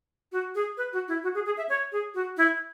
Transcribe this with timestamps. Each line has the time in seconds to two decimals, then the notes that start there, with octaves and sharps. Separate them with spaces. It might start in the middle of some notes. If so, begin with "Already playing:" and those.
0.32 F#4
0.55 G#4
0.77 B4
0.93 F#4
1.08 E4
1.23 F#4
1.35 G#4
1.46 G#4
1.57 E5
1.69 C#5
1.92 G#4
2.14 F#4
2.37 E4